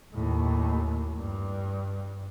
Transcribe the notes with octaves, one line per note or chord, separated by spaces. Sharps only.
D#2 A2
G2